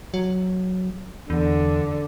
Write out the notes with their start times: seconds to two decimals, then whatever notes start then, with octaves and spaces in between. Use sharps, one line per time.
0.14 F#3
1.30 E2 D3